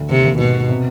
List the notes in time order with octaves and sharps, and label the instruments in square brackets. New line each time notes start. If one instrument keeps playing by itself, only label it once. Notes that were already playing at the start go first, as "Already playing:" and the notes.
Already playing: [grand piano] D2
[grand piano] D#2 [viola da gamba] C3
[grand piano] D#2
[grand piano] G#2 [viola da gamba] B2
[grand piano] B3
C3